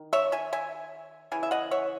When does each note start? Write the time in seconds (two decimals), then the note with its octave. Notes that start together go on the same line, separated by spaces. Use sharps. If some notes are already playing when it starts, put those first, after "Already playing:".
Already playing: D#3
0.13 C#5 E5
0.32 E5 G#5
0.53 E5 G#5
1.32 C#3 E3 G#5
1.43 E5
1.51 D#5 F#5
1.71 C#5 E5